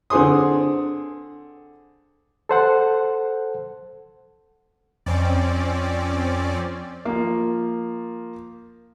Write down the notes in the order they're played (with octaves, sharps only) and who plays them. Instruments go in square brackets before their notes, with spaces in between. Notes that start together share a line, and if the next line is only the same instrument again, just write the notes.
[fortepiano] D3 C4 G#4 C6 D#6
[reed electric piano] A4 C5 F#5
[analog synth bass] F2 [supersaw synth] C4 C#4 D5
[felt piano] F3 A#3